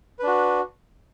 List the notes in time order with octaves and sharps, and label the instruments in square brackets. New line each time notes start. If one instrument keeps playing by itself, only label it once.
[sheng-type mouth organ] B4
D4
F#4